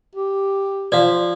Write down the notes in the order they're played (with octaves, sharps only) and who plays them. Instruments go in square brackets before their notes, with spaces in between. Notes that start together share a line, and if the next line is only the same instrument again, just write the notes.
[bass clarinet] G4
[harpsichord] F3 [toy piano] D5 F5